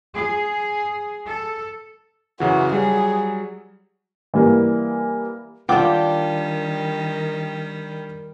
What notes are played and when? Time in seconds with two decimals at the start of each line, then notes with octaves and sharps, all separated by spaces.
0.14 G#4
1.27 A4
2.40 F#2 C#3 E3 F#4
2.73 F#3 G3 G#4
4.34 E3 G3 A#3
5.69 D#3 G3 D4 F4 A#4 G5 D6